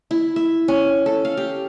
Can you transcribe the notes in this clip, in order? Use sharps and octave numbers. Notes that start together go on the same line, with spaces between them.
E4
E5
C#4
A4
F5
G4